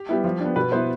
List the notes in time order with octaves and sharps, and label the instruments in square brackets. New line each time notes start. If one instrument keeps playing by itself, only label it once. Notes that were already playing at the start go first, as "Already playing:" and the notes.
Already playing: [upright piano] G4
G3 B3 E4
F3
B3 D4
B2 B4
B3 E4 C5